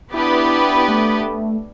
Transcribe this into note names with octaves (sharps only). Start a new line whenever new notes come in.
B3 D4 E4 G4 B4
A3